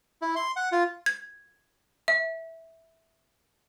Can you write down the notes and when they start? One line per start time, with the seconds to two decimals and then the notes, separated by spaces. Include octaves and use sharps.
0.22 E4
0.36 C6
0.56 F#5
0.72 F4
1.06 G#6
2.08 E5